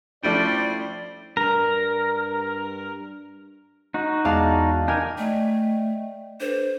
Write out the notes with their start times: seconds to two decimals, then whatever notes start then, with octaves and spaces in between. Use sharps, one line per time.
0.23 F3 G3 A3 C#4 D4 E4 C5 D5
1.37 G2 A#4
3.94 D#4 F#4
4.25 E2 G#3 D5 F5 A5
4.88 D#4 G4 A#4 G#5
5.18 A3 D5 D#5 G5
6.40 D4 A4 B4 C5